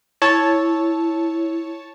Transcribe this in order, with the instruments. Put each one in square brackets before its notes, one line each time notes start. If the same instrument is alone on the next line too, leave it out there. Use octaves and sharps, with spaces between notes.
[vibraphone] E4 [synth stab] C#5 A5